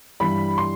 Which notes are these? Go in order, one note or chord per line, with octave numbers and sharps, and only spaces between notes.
G2 E3 G3 B5
C6